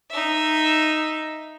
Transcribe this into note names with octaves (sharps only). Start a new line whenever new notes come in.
D#4 E5